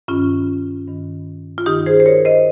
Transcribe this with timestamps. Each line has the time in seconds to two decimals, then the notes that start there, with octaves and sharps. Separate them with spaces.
0.08 G2 D#3 C#4 F4
0.87 G2 D#3
1.58 F4
1.66 G2 D#3 D#4 G4
1.86 G#4 C5
2.00 C5
2.06 A#4 C#5
2.25 C5 D#5